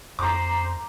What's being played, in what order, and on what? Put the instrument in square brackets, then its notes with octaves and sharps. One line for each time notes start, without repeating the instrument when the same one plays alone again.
[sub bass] F2 [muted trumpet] C5 [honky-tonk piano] A#5 D6